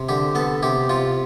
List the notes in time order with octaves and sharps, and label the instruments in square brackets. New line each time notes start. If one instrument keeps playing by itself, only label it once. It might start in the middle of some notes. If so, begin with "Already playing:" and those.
Already playing: [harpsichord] C3
D3 G4
B3 A4
C3 G4
C3 F4